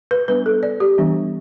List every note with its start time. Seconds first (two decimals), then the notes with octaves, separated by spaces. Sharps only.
0.11 B4
0.28 G3 B3 D4 B4
0.46 A4
0.63 D5
0.80 G4
0.98 E3 G3 B3 D4